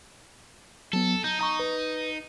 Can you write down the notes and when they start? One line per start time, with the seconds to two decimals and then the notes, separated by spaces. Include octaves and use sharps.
0.93 F#3 B3 A4
1.24 D#4 G6
1.41 D#4 A#5 C#6
1.60 B4